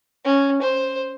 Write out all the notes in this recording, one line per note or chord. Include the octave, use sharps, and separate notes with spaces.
C#4
C5